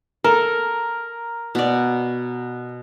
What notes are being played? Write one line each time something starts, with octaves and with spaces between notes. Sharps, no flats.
A4 A#4
B2 D5